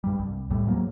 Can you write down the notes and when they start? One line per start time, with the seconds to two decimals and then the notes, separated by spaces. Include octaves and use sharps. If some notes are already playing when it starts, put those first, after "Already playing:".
0.04 G2 G3
0.19 C2
0.50 D#2 A2 G3 A3
0.67 G#2 F#3 A#3